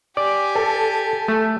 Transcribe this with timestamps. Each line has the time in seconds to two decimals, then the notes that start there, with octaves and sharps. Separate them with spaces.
0.17 G4 D5 G#5
0.55 A4
1.28 A3